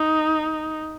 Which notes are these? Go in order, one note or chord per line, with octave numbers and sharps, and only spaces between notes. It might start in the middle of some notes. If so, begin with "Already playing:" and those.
Already playing: D#4